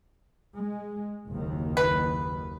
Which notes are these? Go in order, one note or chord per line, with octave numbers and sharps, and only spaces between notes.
G#3
F#1 D#2 D#3
B4